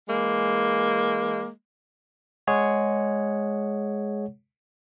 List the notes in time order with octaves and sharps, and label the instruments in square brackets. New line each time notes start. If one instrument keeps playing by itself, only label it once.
[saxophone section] E3 G#3 A#3
[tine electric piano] G#3 G#4 C#5 F#5